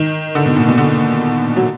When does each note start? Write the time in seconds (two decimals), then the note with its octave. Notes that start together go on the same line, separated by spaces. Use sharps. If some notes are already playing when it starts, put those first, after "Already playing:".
Already playing: D#3
0.35 D3
0.46 B2
0.57 A#2
0.68 B2
0.78 D3
1.57 F#3